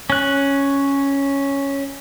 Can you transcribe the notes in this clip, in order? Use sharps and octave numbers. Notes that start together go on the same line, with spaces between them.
C#4 F#6